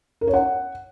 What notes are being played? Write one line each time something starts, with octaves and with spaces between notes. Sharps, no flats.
A#4
C#5
F#5